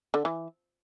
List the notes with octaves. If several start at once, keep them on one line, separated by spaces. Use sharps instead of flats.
D3
E3